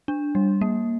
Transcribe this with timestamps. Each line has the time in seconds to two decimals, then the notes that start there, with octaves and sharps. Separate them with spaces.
0.08 D4
0.35 G3
0.61 A#3